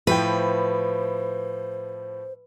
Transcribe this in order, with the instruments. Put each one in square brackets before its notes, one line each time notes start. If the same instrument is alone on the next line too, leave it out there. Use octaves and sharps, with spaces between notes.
[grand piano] A2 F3 G5 [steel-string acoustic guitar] B4 [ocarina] C5